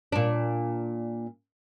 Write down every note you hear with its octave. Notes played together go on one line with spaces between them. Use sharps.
A#2 D4